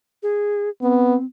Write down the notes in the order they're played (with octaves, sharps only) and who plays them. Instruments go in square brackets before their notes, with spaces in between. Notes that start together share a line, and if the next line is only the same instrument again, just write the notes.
[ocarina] G#4
[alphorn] B3 [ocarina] C4